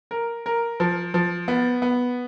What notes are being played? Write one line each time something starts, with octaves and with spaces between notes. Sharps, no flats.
A#4
A#4
F3
F3
B3
B3